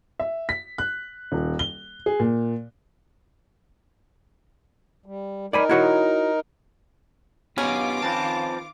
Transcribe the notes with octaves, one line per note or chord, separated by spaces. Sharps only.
E5
B6
F#6
D#1
G7
G#4
A#2
G3
D#4 A#4 D5 G#5 B5
E4 F#4 C#5
B2 D#3 B3 C#4 F4 G4 B4 D6
F3 C4 B4 A5